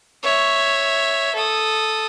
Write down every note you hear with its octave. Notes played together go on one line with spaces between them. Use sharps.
C#5 E5
A4 D#6